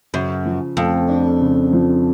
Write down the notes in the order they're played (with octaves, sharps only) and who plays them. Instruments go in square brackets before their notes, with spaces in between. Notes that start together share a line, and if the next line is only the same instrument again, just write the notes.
[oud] F#2 [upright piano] C#3
[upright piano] F3
[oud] F2 [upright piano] A3
[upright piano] D4
C#3
F3